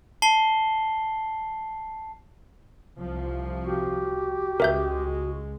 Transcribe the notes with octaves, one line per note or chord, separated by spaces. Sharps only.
A5 C7 G7
C2 C3 F3
F#4 G4
C#2 G#3 A#4 E5 G6